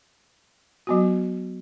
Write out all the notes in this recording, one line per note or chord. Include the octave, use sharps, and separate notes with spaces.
F#3 B3 F#4